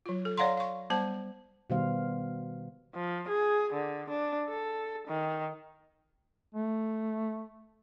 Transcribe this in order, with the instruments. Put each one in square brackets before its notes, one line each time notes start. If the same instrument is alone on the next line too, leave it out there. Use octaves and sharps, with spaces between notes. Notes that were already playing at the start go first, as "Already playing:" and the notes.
[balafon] F#3 F4
A4
C#5 D5 F5 F#5 A#5 C6
F5 C#6
G3 B3 C5 A5
[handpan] B2 D#3 G3 B3 C5 F5
[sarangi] F3
G#4
D3
D4
A4
D#3
[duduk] A3